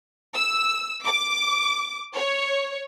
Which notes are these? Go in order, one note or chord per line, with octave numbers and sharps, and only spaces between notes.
E6
D6
C#5